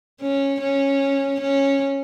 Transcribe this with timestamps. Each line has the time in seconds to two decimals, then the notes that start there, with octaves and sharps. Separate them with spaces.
0.20 C#4
0.61 C#4
1.41 C#4